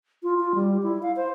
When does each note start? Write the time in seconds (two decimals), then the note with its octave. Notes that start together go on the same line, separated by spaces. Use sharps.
0.23 F4
0.40 F4
0.55 G3
0.83 E4
1.03 F5
1.16 C5